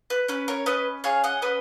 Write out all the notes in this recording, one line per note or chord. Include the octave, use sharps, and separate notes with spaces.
B4
C#4 B4
A#4 C#5
C#4 B4 D#5
G#4 C#5 F5
D#5 F#5
C#4 B4 D#5